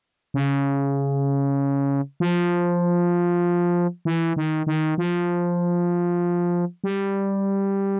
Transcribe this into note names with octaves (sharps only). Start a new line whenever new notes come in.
C#3
F3
E3
D#3
D#3
F3
G3